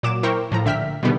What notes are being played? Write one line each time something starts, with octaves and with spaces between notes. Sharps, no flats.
A#2 F#3 D6 E7
E4 A#4 C5 G5 C#6
A2 F3 A#5
A#1 D3 E5 G5 F6 B6
B2 D3 D#3 G3 B3